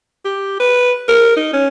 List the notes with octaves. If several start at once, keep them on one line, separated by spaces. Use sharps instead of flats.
G4
B4
A#4
D#4
C#4